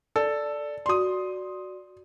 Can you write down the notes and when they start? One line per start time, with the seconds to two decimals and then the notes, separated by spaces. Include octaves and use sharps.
0.16 A4 D5
0.86 F#4 D5 C6 D#6